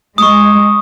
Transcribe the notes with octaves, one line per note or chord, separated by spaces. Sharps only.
G#3 C#6 D#6